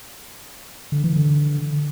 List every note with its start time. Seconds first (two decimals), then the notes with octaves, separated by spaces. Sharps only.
0.92 D3
1.04 E3
1.16 D3